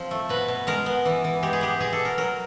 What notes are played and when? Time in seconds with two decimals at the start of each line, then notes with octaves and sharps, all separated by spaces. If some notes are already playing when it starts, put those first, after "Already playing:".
Already playing: F3 C4
0.11 A3
0.29 B2 B4
0.48 B2
0.67 G#3 A#4
0.86 B3
1.05 E3
1.24 E3
1.43 G#3 G4
1.53 G#4
1.61 B3 G4
1.80 B2 G#4
1.93 A4
1.99 B2
2.05 A#4
2.17 F#3 A#4